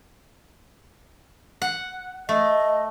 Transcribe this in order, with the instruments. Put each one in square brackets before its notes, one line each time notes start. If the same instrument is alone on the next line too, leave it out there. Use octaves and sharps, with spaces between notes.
[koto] F#5
[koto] A3 [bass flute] D#5